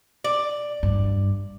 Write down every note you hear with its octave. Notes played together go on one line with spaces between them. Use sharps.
D5
G2